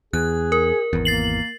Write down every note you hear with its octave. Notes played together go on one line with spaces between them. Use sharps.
E2 G#4 F#6
A#4
G#1 E2
A#3 A6 C7 F#7